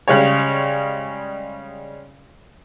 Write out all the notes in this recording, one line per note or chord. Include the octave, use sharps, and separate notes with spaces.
C#3 G3 G#3 G4 C#5